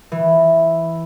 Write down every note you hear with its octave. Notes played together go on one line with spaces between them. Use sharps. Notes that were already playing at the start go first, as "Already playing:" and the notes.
E3